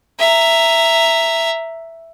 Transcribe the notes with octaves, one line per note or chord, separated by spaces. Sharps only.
E5 A#5